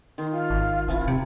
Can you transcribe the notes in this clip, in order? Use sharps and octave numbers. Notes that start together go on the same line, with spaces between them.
D#3 C6
F4
G#1
D#1 F3 C4 E4
C3